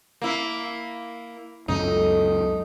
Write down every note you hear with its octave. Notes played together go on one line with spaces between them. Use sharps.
A#3 E4
C#2 F#2 F#3 A3 D#4 A4